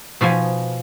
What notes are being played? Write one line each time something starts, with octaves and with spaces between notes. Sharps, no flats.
B2 F3 B3 G#5